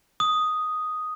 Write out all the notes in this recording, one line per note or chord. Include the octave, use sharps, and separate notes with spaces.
D#6